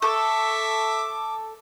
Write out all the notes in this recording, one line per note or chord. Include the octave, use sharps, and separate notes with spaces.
A4 E5 C#6 D6